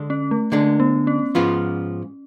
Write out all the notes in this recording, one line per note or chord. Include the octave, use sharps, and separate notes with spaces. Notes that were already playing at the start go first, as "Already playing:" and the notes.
Already playing: D3 G#3 D4
C#4
A3
D3 G#3 A3 D4
B3
C#4
G#2 F3 B3 F4